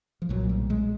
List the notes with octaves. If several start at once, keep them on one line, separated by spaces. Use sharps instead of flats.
F3
B1 A#2 F#3
G3
G#3